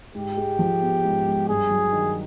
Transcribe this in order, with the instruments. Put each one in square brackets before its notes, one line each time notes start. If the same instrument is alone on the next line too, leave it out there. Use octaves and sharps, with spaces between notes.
[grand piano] G#2 [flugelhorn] G4
[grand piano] G#3
F3
B3
G#2
G#3
[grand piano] G2 [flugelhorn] G#4
[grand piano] F#3
D#3